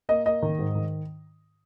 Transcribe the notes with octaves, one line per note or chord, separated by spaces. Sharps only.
A#3 D#5
A#3 D#5
D#3
G#2
D#3